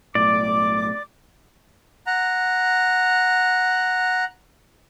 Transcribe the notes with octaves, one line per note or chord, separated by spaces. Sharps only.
B1 A2 D5 D6
F#5 A#5